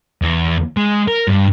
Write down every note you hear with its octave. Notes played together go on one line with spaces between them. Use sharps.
E2
G#3
A#4
G2